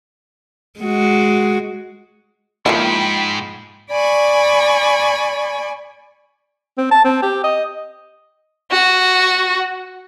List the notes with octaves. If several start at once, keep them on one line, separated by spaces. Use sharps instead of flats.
G#3 F#4
G#2 F3 A#3 E4 G5 B5
D5 G#5 B5 C#6
C4
A5
C4
G4
D#5
F#4